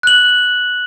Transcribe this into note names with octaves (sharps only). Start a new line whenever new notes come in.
F#6 F#7